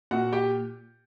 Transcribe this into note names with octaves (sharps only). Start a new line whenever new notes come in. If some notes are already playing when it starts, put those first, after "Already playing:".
A#2 F#4 F#5
G4 G5